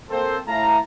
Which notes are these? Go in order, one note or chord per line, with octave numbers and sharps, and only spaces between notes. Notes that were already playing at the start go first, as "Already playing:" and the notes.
A#3 C4 A4 C5
A2 A3 E4 F5 A5 A#5